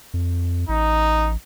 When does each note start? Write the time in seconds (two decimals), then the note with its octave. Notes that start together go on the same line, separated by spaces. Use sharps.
0.14 F2
0.69 A1 D#4